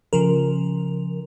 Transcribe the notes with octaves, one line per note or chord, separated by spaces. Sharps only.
C#3 F3 A#4